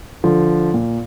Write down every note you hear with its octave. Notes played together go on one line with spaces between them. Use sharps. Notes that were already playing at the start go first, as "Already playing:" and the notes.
D3 F3
A#2